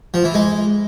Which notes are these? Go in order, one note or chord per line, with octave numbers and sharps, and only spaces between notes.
F3
E3
G#3